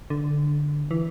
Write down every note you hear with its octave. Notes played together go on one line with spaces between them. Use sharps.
D3
E3